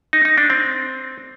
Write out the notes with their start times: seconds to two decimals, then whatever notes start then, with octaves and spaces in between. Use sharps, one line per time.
0.13 D#4
0.25 D#4
0.38 D4
0.50 C4